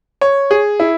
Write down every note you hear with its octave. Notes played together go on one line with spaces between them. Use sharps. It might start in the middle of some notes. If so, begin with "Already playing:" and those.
C#5
G#4
E4